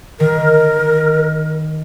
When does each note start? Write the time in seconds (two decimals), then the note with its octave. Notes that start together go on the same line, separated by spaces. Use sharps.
0.20 D#3 A#4